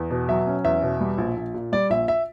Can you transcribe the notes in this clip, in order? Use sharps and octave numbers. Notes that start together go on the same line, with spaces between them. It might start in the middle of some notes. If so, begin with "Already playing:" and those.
Already playing: E2
B2
F#3 E5
C#4
E2 E5
B2
G3
A#1
A#1
A#2
G3 D5
A#1 E5
E5